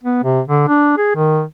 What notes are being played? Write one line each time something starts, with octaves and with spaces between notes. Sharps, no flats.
B3
C3
D3
D4
G#4
D#3